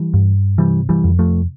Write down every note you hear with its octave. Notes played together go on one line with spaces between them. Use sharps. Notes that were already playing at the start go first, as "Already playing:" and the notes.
Already playing: E3 G3
G2
C3 E3 G3
E3 G3
F2
F3 A3